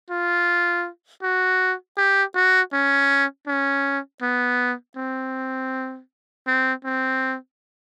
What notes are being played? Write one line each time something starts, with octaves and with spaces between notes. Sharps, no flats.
F4
F#4
G4
F#4
C#4
C#4
B3
C4
C4
C4